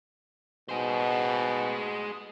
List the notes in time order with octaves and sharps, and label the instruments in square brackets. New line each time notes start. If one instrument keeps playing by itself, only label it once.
[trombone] B2 [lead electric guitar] G#4 C5